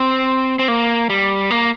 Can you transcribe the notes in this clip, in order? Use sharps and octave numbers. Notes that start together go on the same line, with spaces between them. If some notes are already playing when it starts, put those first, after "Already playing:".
Already playing: C4
C4
A#3
G3
A#3